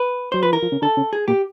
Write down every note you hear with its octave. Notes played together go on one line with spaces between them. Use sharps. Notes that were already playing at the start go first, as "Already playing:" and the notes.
Already playing: B4
F#3 C5
F3 B4
E3 A#4
F3
C#3
D3 A4
C#3
G#4
A#2 G4